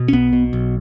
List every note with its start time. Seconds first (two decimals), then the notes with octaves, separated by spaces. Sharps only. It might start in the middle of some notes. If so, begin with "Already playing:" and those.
Already playing: B2
0.08 C#4
0.13 B1 B3
0.33 B2
0.53 B1